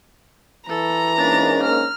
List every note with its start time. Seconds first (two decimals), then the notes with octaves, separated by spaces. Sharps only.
0.69 E3 A4 A#5
1.18 G#2 A#3 C#4 D4 A6
1.63 F6